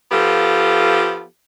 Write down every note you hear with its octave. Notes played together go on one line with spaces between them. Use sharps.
F3 B3 F4 G4 A4